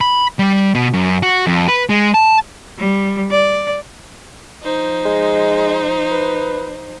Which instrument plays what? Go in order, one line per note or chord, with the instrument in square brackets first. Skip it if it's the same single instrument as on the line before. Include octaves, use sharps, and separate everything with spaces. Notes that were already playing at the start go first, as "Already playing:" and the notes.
[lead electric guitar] B5
G3
B2
F#2
F#4
F2
B4
G#3
A5
[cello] G3
D5
[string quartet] F3 D#4 C5
[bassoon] G#3
B4